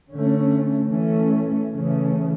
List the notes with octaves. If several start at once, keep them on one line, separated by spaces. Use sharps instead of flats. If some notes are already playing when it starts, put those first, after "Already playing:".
D3 A3 C#4
E3 A3 C#4
C#3 E3 A3 C#4